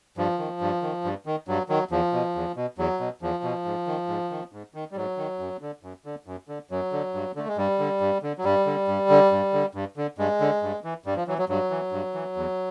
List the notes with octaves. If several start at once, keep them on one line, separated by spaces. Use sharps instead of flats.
G2 F3
D#3
G2
D#3
G2
D#3
G2 F#3
D#3 F#3
E2 F3
B2
E2
B2
E2 F#3
B2
E2 F3
B2
G#2
D#3
G#2
D#3
G#2
D#3
G3
G#2 F#3
D#3
F#2
D3
F#2
D3
F#2
D3
F#2 F#3
D3
G2
D3 A3
G#3
G2 G3
D3
G2
D3
F#3
G2 G3
D3
G2
D3
G2
D3
G2
D3
G2 G#3
D3
G2
E3
G2 G3
F3
E3 F#3
F#3
G2 F#3
E3
G2
E3
E2